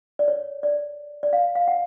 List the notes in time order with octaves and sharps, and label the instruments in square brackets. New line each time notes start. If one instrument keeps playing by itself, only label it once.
[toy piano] D5
C#5
D5
D5
F5
F5
F#5